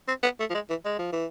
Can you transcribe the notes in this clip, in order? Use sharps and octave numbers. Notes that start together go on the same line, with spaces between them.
C4
B3
A3
F3
G#3
E3
G#3
F3
E3